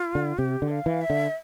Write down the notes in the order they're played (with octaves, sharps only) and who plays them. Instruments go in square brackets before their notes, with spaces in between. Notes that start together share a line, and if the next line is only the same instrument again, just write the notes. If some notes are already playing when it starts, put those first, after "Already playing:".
Already playing: [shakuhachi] F4
[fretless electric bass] D3
[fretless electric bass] C3 [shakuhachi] G4
[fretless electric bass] D3
[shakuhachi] F5
[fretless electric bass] E3
[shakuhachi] E5
[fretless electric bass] D3